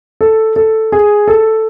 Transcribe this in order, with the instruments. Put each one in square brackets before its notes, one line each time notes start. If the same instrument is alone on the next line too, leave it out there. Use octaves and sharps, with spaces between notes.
[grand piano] A4
A4
G#4
A4